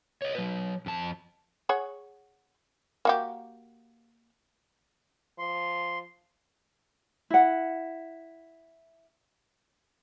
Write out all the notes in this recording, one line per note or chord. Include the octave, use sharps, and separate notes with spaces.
C#5 D#5
F#3 B4
F2 A5
G#4 C#5 F#5
A#3 F#4 G4
F3 C6
E4 F#5